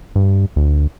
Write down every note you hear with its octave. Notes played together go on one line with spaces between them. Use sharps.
G2
D2